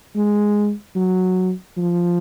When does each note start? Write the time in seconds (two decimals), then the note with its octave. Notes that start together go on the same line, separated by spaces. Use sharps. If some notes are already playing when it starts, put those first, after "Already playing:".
0.15 G#3
0.96 F#3
1.77 F3